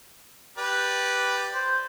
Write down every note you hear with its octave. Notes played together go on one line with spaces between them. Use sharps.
G4 B4 D5
C5